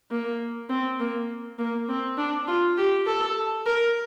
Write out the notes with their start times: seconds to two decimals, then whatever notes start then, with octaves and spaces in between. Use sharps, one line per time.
0.11 A#3
0.69 C4
1.00 A#3
1.59 A#3
1.88 C4
2.18 D4
2.48 F4
2.77 G4
3.06 A4
3.66 A#4